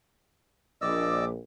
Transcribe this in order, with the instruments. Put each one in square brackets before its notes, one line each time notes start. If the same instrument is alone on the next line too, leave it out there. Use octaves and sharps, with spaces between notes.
[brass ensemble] A#1 [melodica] D5 D#5 E6 [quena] D6